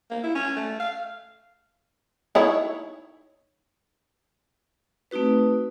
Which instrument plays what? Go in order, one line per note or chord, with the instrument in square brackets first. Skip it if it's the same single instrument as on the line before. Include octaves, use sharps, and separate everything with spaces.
[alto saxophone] A#3
E4
C#4
A3
F5
[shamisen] D#4 E4 C#5
[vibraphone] A3 C4 D#4 F#4 B4